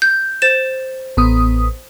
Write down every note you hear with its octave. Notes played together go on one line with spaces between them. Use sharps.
G6
C5 A6 E7
A1 B3 D#6